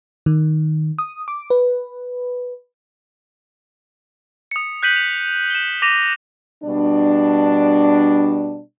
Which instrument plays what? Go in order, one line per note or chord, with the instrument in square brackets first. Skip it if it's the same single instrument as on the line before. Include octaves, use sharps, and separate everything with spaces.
[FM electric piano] D#3
D#6
D6
B4
[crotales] D#6 C#7
F#6 G6 B6 D#7 F#7
F7
E7 G7
D6 A#6 D#7 F7
[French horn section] B2 G3 D4